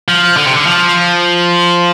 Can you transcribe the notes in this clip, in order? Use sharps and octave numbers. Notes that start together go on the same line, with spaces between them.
F3
D3
C3
D3
F3